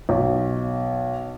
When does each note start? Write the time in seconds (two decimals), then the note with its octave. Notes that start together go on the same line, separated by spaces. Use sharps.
0.09 B1